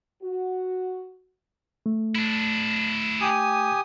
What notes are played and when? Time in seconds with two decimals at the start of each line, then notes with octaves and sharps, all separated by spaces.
0.23 F#4
1.86 A3
2.15 D4 E4
3.21 G4 G#5 D#6